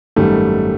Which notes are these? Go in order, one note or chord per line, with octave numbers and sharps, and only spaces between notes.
G#1 F#2 D#3 G3 A3